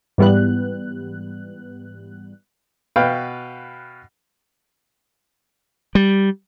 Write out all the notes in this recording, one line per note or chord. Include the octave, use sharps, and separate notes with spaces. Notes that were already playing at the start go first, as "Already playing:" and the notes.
G#2 E3 G3 B3 F#6
B2 B4 F5 G5
G3